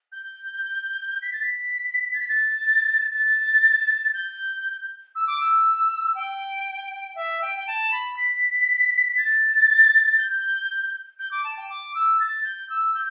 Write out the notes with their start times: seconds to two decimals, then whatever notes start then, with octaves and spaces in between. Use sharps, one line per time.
0.12 G6
1.21 B6
1.32 A6
1.42 B6
2.13 A6
2.20 B6
2.28 A6
3.13 A6
4.13 G6
5.15 E6
5.27 D6
5.40 E6
6.15 G5
7.15 E5
7.41 G5
7.57 G5
7.67 A5
7.91 B5
8.16 B6
9.16 A6
10.17 G6
11.19 G6
11.31 D6
11.44 A5
11.57 G5
11.69 D6
11.94 E6
12.19 A6
12.44 G6
12.69 E6
12.94 G6